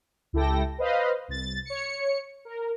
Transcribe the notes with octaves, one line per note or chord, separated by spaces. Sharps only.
C#2 E4 G4 A4 G5 A#6
B4 C5 D#5 F5 B5
C2 A6
C#5 C#7
A#4